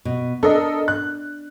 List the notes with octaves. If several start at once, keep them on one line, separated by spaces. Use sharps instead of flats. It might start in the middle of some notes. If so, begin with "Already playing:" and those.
B2
D4 A4 A#4 D#5
F#6